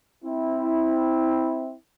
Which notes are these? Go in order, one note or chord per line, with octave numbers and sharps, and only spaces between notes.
C4 E4